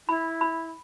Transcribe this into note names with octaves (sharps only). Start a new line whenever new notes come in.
E4 B5
B5